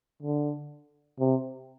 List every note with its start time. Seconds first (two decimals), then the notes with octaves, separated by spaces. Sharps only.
0.22 D3
1.20 C3